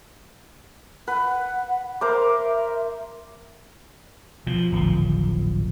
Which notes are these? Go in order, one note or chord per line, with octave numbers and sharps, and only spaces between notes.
B4 F#5
A#4 C5 E5 D6
B2 F3
D1 G#1 F3